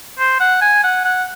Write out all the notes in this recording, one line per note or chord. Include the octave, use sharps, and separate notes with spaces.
C5
F#5
G#5
F#5
F#5